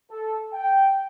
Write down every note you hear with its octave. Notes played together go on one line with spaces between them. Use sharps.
A4
G5